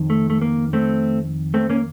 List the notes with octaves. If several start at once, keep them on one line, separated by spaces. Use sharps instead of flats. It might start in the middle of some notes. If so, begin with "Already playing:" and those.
Already playing: F2 D#3
A3
A3
A#3
A3 C4
A3 C4
A#3 C#4